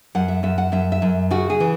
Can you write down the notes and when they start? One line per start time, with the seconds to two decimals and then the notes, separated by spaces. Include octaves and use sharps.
0.15 F#2 F#5
0.28 E5
0.43 F#2 E5
0.58 F#5
0.72 F#2 E5
0.92 E5
1.02 F#2
1.31 C#3 F#4
1.50 G#4
1.60 E3